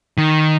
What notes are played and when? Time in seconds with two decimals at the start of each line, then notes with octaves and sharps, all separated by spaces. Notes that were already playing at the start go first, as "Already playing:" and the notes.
0.18 D#3